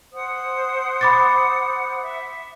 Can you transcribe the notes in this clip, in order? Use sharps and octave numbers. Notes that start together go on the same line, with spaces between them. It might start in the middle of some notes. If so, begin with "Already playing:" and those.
C5 F#5 D#6
B5 D6 A6
E5